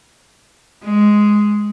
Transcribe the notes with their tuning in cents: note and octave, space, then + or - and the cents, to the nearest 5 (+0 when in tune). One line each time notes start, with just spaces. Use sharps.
G#3 +5